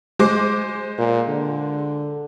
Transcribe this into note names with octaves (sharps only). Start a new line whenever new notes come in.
G#3 C5 D6
A#2
D3